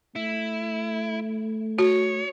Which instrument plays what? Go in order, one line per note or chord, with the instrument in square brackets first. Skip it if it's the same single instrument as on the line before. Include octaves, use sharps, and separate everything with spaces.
[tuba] A3 [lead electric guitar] E4
[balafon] F#4 [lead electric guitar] C#5